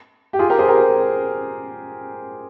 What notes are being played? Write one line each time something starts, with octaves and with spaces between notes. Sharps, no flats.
G4
F4 G#4
G4 A#4
G#4 C5
G4 A#4